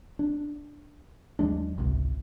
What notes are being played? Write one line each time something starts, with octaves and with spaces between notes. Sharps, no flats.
D4
D#2 F#3 G#3 D4
G#1 C#2 C3